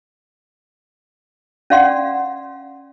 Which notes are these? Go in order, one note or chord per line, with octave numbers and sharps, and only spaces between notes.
C#4 D5 F5 F#5 C6